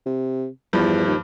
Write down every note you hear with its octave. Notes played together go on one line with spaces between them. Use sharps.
C3
E2 G2 F3
D#2